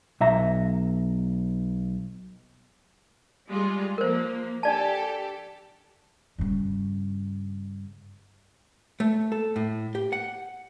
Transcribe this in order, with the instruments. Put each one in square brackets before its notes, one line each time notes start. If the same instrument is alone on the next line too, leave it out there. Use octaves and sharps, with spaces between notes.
[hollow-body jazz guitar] B1 E5 A#5
[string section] G3 G#3 F4
[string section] F3 A#3 [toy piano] A#4 C5
[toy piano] D4 D5 A5 [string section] G4 A4
[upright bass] G2 C#3
[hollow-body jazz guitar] A3
A4
A2
G4
F#5